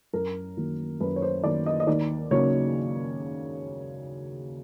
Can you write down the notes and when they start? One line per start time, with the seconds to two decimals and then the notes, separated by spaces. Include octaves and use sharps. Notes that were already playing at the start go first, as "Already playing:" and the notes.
0.13 F#2 A#4
0.57 D#3 F#3 A#3
1.00 F#2 B4
1.16 C#5
1.22 C5
1.44 D#3 F#3 A#3 D5
1.66 D#5
1.80 D#5
1.87 D#2 D5
2.31 C#3 F#3 A#3 C#5